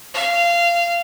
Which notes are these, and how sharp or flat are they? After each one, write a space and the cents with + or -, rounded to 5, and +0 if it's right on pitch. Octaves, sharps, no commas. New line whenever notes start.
F5 -20